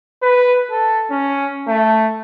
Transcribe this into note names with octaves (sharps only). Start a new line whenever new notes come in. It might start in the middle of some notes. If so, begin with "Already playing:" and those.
B4
A4
C#4
A3